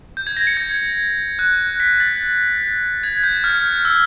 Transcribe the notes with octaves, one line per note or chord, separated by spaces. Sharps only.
G6
G#6
A#6
C#7
G#6
F#6
B6
A6
G#6
G6
F6
E6